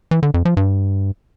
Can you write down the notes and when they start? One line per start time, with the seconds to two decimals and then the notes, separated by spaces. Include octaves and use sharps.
0.11 E3
0.23 D3
0.34 F2
0.45 F3
0.57 G2